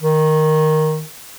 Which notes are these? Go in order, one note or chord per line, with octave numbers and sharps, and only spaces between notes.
D#3